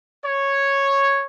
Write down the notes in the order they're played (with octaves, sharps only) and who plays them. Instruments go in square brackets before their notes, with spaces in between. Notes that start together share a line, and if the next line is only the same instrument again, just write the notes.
[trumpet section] C#5